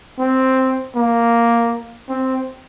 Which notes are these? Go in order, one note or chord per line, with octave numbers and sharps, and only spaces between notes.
C4
A#3
C4